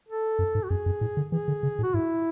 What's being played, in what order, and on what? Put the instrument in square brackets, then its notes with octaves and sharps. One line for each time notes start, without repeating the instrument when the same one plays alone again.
[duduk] A4
[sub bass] F#2
G#2
[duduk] F#4
[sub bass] F#2 [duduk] G#4
[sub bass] F#2
A2
D3
[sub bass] E3 [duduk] G#4
[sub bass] D3
C#3
A2
[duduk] F#4
[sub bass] G#2 [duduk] E4